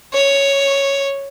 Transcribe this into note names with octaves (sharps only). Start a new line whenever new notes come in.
C#5